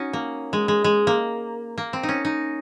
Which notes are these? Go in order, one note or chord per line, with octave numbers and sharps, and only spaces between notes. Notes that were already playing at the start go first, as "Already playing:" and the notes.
Already playing: C#4 D#4 F#4
A#3
G#3
G#3
G#3
A#3
A#3
C4
D#4
C#4
D#4